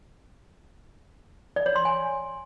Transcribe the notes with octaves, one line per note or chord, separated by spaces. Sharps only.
D5
C#5
C6
G#5